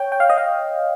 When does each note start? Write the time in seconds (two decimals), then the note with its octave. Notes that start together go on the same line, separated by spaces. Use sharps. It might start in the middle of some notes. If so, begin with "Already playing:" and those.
Already playing: C#5 G5
0.12 G5
0.20 F5
0.30 D#5
0.38 F5